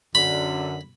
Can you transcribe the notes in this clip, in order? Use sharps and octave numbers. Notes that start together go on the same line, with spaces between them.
F#2 D3 B5